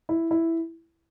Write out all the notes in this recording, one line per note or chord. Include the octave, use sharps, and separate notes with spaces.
E4
E4